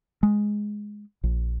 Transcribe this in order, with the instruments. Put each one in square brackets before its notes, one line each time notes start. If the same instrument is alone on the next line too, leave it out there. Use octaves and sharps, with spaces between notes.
[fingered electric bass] G#3
A#1